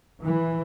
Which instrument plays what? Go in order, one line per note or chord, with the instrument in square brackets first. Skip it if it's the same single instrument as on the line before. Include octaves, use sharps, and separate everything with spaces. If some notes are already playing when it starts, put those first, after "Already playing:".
[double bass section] E3